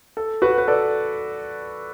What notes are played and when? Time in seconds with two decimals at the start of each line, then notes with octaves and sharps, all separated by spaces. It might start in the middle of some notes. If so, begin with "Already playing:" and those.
0.17 A4
0.42 F#4 B4
0.58 B4
0.68 A4 D5